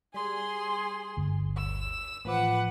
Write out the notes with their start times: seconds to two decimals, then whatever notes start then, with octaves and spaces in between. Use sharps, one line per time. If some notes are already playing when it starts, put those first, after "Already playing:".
0.14 G3 G#4 C6
1.17 G1 D2
1.58 E6
2.25 A1 F3 B4 F#5 D6